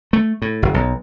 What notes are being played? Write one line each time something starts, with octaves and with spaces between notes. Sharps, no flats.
A3
A2
F#1
B1